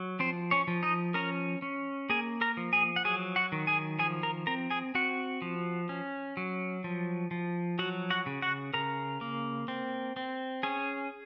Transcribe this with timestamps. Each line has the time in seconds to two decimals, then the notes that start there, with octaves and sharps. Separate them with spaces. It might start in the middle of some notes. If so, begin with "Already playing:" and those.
Already playing: F#3
0.19 F3 C4 C5
0.51 C#4 C#5
0.68 F3
0.83 D#4 D#5
1.14 C#4 A#4 A#5
1.62 C#4
2.10 A#3 G#4 G#5
2.41 A#4 A#5
2.57 F3
2.73 G#4 G#5
2.96 F#5
3.05 F#3 G#4 G#5
3.36 F#4 F#5
3.52 D#3
3.67 G#4 G#5
3.99 F3 G#4 G#5
4.23 A#4 A#5
4.47 C4 A#4 A#5
4.70 G#4 G#5
4.95 C4 F#4 F#5
5.42 F3
5.89 C#4
6.37 F#3
6.84 F3
7.31 F3
7.79 F#3 F#4 F#5
8.10 F#4 F#5
8.26 C#3
8.42 F#4 F#5
8.74 C#3 A#4 A#5
9.21 A#3
9.68 C4
10.16 C4
10.63 C#4 G#4 G#5